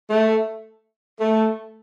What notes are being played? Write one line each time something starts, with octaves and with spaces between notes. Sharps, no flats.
A3
A3